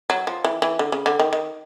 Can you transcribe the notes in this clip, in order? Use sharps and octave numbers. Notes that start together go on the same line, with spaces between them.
F#3
F3
E3
E3
D3
C#3
D3
D#3
D#3